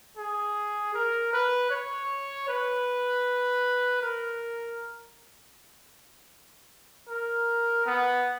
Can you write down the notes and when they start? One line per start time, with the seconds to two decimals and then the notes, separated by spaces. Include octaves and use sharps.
0.17 G#4
0.94 A#4
1.33 B4
1.70 C#5
2.48 B4
4.02 A#4
7.09 A#4
7.86 B3